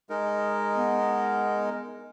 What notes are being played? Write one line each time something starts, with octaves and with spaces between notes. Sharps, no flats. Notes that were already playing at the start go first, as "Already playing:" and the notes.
G#3 D#4 A#4
B3